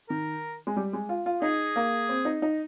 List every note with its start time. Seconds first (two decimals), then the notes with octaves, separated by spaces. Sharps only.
0.09 D#3 A#4
0.67 G#3
0.76 G3
0.93 G#3
1.09 F4
1.26 F4
1.42 D#4 G#4
1.76 A#3
2.09 C4
2.25 D#4
2.42 D#4